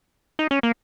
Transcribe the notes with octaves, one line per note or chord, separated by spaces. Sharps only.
D#4
C#4
A#3